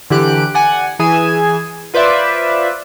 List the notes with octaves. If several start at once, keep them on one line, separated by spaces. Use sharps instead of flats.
D3 E3 G4 F#6 D7
D5 F#5 G#5
E3 G#4 G#5 E7
F4 B4 C5 D5 E5